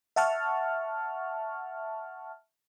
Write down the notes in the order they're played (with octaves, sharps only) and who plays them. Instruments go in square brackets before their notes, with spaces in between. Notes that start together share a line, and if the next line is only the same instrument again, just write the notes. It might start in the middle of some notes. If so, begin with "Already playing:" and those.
[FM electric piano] E5 F#5 A5 C#6 F6